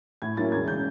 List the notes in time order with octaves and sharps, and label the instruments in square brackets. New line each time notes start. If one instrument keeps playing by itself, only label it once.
[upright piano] A2 G#6
F#3 A#3 C#4 E4 A6
E1 G#6
C#3 G6